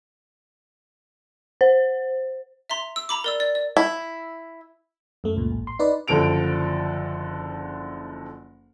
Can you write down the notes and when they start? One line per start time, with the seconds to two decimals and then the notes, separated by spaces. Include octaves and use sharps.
1.61 C5
2.70 E5 A#5 C6
2.96 E6
3.09 A#5 B5 D6
3.24 A#4 D5 E6
3.40 D5
3.55 D5
3.77 E4
5.24 F#2 A3
5.37 C#2 A#2
5.51 A1
5.67 C6
5.79 D#4 B4 D5
6.08 F#1 D3 F3 A4 D7 F7